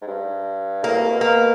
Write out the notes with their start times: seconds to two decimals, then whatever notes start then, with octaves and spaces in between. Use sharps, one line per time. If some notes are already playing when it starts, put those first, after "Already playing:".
0.02 G#2
0.08 G2
0.83 A2 A#3
0.97 B2
1.03 C3
1.09 B2
1.21 A#3